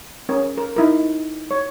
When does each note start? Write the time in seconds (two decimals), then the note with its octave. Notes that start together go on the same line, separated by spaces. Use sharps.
0.29 C#4 A#4
0.58 A#4
0.76 D#4 E4 A#4
1.51 C#5